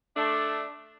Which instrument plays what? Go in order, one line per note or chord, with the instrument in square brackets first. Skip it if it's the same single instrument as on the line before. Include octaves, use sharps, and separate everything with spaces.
[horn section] A3 D4